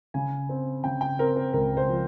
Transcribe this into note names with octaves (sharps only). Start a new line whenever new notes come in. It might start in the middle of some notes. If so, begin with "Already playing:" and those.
C#3 G#5
C4
C#3 G5
G5
C4 A#4
C5
C#2 A#4
C5
F3